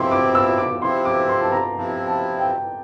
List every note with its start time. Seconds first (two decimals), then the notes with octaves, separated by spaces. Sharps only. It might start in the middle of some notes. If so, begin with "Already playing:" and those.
Already playing: C3 F3 C4 E4 C6 D6
0.11 D6
0.35 E6
0.58 D6
0.82 C3 F3 C4 E4 C6
1.05 D6
1.29 C6
1.41 A5
1.52 A#5
1.76 C3 F3 C4 E4 A5
2.07 A5
2.39 G5